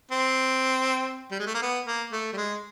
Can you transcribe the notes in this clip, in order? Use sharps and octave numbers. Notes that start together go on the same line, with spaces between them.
C4
G3
G#3
A3
A#3
B3
A#3
A3
G3
G#3